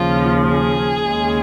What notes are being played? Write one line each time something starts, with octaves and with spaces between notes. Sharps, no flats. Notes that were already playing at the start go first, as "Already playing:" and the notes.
Already playing: D#2 C#3 F3 F4
G#4
D#2 C#3 G#3